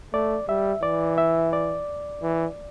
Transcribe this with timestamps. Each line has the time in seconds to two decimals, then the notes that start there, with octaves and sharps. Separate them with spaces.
0.13 A3 D5
0.48 G3 E5
0.83 E3 D5
1.18 E5
1.53 D5
2.22 E3